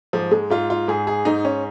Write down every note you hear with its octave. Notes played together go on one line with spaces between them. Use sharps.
G#2 F3
G#3
G#2 F4
F4
G#2 G#4
G#4
G#2 D#4
C#4